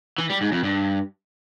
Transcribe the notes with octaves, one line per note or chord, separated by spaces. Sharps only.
E3
G3
G#2
F2
G2